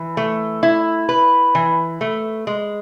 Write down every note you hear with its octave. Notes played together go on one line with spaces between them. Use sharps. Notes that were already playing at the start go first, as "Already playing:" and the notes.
Already playing: E3
A3
E4
B4
E3
A3
G#3